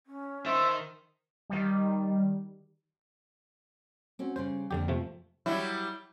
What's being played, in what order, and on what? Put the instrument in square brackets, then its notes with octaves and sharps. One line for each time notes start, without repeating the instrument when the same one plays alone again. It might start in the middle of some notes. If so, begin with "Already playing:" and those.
[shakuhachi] C#4
[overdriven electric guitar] D#3 [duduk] C5 [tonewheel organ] E5 A5
[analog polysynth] D#3 G3
[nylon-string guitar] C4 C#4 F#4
[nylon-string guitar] C#3 G3 C#4 [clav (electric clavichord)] C5
[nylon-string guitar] F2 A#3 [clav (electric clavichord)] D3 G4
[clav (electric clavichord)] C3 F3 A3
[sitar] F#3 G3 E4